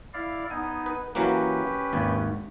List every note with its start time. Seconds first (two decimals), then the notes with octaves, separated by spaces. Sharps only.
0.14 E4 D5 F5
0.50 B3 D#4 G#5
0.86 B4
1.15 E3 F#3 A#3 C#4 G4 B4
1.93 G#1 D#2